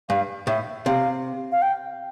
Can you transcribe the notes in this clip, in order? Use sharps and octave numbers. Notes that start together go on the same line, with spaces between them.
G2 F5
A2 E5
C3 F5
F5
G5